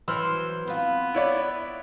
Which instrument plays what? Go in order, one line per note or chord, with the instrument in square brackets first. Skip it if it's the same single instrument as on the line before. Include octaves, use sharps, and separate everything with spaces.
[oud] E3 F#3 B3 [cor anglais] C5 [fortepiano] B5 E6 F6
[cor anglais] B3 [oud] C4 F4
[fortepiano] E4 C#5 D5